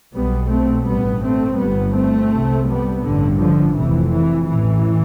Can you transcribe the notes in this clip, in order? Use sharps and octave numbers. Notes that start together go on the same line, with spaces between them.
B1 B2 G3 B3
A3 C4
A1 G2 G3 B3
A3 C4
G1 G2 G3 B3
A3 C4
C2 C3
G3 B3
A1 G2 D3
D3 F3
F1 F2 C3 E3
E3
A1 A2 E3